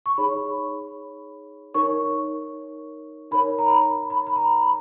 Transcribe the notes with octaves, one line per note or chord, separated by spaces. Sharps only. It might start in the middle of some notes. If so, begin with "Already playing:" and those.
C#6
D#4 G#4 C#5 B5
D#4 A#4 C#5 C#6
D#4 A#4 C#5 B5
A#5
B5
B5
B5
A#5
B5